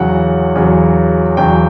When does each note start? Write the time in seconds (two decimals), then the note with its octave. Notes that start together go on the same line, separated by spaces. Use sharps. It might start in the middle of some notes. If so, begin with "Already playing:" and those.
Already playing: E2 C#3 F#3 F#5
0.55 E2 C#3 F#3
1.37 E2 C#3 F#3 G5